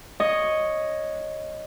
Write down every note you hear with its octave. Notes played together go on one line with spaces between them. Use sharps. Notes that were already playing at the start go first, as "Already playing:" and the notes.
C#5 D#5 D#6